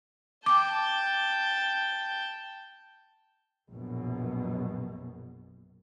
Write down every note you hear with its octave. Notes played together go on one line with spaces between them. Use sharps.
G5 A5 D6
A#1 F#2 B2